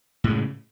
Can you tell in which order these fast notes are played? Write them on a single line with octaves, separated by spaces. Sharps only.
A2 G#3 C#3